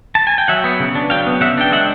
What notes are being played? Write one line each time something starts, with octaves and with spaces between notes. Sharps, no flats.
A5
G#5
G5
F#3 E5 F#5
B3
C#3
D4
F#3 F5 G5
B3
C#3 E5 F#5
D4 G5
G#3 E5 F#5